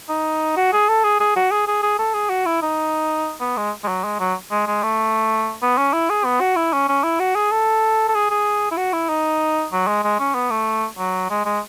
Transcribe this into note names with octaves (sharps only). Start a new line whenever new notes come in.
D#4
F#4
G#4
A4
G#4
G#4
F#4
G#4
G#4
G#4
A4
G#4
F#4
E4
D#4
B3
G#3
G#3
F#3
G#3
F#3
G#3
G#3
A3
B3
C#4
E4
G#4
B3
F#4
E4
C#4
C#4
E4
F#4
G#4
A4
A4
G#4
G#4
E4
F#4
E4
D#4
F#3
G#3
G#3
C#4
B3
A3
F#3
G#3
G#3